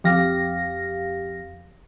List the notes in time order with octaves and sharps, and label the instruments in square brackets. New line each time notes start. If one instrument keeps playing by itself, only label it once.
[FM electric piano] F2 G4 F5 A#6